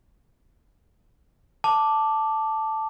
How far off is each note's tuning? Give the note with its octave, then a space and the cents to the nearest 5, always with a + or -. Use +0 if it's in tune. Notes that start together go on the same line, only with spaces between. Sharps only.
A5 +0 D6 +0